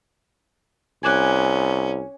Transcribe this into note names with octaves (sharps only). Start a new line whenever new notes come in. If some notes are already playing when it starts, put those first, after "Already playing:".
C2 C#4 G#5 D6 F#6